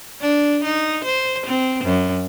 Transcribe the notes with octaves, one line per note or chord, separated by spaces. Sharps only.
D4
D#4
C5
C4
F#2